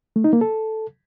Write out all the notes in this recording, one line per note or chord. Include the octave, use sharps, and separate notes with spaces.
A3
D#4
A#3
A4